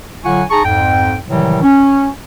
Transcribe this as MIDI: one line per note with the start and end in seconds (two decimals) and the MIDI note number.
0.25 0.42 50
0.25 0.42 54
0.25 0.42 65
0.25 0.42 78
0.25 0.42 80
0.25 0.42 85
0.50 0.63 63
0.50 0.63 68
0.50 0.63 81
0.50 0.63 82
0.50 0.63 85
0.65 1.17 41
0.65 1.17 44
0.65 1.17 79
1.27 1.60 45
1.27 1.60 48
1.27 1.60 51
1.27 1.60 52
1.27 1.60 54
1.27 1.60 55
1.63 2.07 61